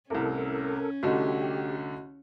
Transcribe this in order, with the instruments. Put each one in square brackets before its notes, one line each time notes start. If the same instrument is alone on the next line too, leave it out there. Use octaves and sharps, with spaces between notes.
[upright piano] C2 A2 C3 [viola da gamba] C#4 [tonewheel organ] A4 A#4
[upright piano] C2 D3 A3 [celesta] F#4 D#5 [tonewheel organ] G4